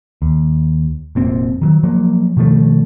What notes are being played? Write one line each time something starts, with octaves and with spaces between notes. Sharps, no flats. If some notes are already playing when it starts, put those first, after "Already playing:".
D#2
F1 A#2 C4
D#3 E3 F#3
F3 F#3 A#3
B2 D#3 F3 A3